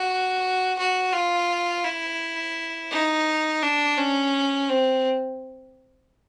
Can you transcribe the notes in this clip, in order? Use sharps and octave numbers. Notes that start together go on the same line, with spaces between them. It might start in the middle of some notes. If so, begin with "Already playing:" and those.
Already playing: F#4
F#4
F4
E4
D#4
D4
C#4
C4